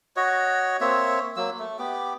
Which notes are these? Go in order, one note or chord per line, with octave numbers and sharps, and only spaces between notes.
F#4 C#5 D#5
A#3 C4 C#5 E5
F#3 A#3 E6
A3
B3 G4 D6